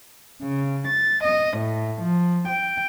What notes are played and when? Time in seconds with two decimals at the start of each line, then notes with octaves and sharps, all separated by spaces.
0.42 C#3
0.88 A6
1.24 D#5
1.57 A2
2.00 F3
2.48 G5